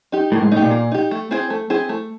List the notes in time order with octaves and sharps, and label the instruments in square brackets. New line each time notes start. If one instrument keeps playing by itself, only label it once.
[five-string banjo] D#4 G4
[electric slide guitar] A2 [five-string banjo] A#3
[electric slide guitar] G#2
[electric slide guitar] A2 [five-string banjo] D#4
[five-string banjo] G4
[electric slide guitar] A#2
[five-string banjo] A#3
D#4 G4
A3
C4 E4 G#4 C5
A3
C4 E4 G#4 C5
A3